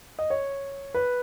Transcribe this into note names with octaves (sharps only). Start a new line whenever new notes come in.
D#5
C#5
B4